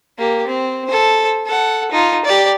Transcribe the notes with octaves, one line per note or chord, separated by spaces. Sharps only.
A#3 G4
C4
A4 C5
A4 F#5
D#4 F4
G4 D5